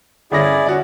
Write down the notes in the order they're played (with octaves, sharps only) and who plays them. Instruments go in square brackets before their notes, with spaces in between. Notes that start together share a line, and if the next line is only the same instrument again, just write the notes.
[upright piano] G1 C#4 A#6 [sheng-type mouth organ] E4 G#4 D5
[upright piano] C#4 F#4 D5